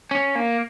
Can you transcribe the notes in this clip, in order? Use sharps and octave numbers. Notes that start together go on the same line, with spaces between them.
C#4
A#3